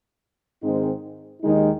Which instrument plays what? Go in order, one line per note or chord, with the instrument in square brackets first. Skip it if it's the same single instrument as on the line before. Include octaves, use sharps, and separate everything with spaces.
[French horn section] G#2 D#3 G#3 C4 D#4
D#2 D#3 G#3 D#4